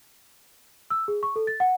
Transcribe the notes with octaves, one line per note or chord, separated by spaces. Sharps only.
E6
G#4
C#6
A4
A6
F#5